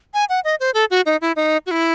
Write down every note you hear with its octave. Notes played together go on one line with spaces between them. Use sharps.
G#5
F#5
D#5
C5
A4
F#4
D#4
E4
D#4
F#4
E4